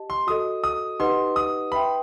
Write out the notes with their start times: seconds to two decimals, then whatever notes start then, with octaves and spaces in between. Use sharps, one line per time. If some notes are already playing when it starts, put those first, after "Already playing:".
Already playing: G4 D#5 A5
0.10 C6
0.27 F#4 A4 D#5 D#6
0.64 D#6
1.00 D#4 G4 B4 D#5 F#5 C6
1.36 D#6
1.72 B4 E5 G5 B5 C6